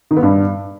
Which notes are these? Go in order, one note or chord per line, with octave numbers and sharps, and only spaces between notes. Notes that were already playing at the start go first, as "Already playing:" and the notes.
D#3
B3
G2